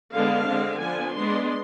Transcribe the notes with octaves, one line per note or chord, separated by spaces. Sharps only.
D3 G#3 B3 D4 F5
D3 G#3 C4
F3 B3 D4 G#5
G#3 B3 D4 C6